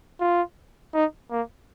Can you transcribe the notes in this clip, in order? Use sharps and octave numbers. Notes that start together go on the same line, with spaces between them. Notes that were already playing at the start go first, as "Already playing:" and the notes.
F4
D#4
A#3